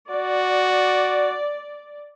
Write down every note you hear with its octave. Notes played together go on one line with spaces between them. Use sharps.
F#4 D5